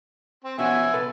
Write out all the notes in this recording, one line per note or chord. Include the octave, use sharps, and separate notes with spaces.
C4
B2 C#4 F#4 E5 G#5
B2 A4 B4